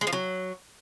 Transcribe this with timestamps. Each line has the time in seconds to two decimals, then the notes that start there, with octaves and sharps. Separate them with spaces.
0.01 G#3
0.07 F3
0.13 F#3